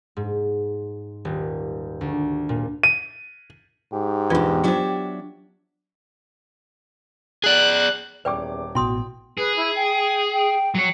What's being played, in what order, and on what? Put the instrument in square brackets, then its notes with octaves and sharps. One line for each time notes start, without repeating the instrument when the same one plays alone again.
[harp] G#2
D#1
D2
A#2
[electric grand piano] D#7
[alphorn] G#2 [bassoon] G4
[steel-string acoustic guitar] E2 B2 [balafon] D4 F4 B4
[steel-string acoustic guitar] F#3 D4 E5 [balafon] F4 C5
[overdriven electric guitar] G#4 D5 [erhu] F#6
[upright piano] D#1 C#4 D6 [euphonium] E2 [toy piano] B4 D5 G5
[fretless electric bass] A1 B2 [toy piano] E4 C6 D#6 [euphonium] F#4 [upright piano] G5
[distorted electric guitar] G#4 [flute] B4
[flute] E4
G5
G5
[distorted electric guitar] F#3 C#5